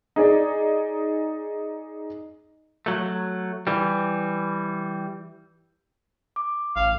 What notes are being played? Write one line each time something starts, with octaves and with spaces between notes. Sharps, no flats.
D#4 G#4 D5
F#3 A3
E3 G3
D6
A1 F5